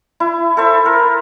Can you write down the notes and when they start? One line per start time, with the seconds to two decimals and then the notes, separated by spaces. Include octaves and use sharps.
0.20 E4
0.57 A4 C5 E5
0.86 A#4